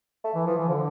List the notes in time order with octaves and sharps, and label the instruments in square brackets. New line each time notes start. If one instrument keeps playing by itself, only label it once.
[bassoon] A3
[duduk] E3
[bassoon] E3 [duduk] F3
[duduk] E3
[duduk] D3 [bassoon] F3